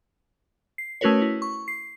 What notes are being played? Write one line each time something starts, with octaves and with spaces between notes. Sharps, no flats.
C7
A3 C#4 F#4 A#4 B4 C#5
E4
C#6
C7